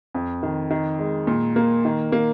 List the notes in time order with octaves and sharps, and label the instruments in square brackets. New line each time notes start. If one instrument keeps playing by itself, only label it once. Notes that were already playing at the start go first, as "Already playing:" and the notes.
[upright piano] F2
D#3
D#3
G#3
A#2
A#3
D#3
A#3